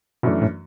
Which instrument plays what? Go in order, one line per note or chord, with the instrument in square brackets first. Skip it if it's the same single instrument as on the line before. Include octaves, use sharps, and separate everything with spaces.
[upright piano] F#2 E3 A3 D4 [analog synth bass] B2
[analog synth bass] A2